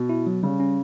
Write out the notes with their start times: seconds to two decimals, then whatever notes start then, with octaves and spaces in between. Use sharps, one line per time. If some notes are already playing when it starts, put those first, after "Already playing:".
Already playing: B2
0.09 E4
0.27 F#3
0.43 C#3 G3
0.60 C#4